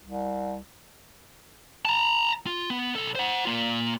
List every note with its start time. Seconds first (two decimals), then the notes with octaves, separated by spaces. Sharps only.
0.04 C2
1.85 A5 A#5
2.46 F4
2.70 B3
2.96 B1 A4
3.15 C5 F#5
3.45 A#3 F4